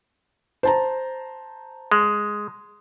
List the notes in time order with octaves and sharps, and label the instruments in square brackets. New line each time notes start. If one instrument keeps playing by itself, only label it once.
[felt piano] C5 A5 A#5
[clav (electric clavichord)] G#3